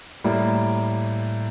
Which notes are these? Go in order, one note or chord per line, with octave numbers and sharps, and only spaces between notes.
A2 G3 A#3